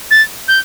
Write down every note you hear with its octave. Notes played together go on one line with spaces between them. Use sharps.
A6
G6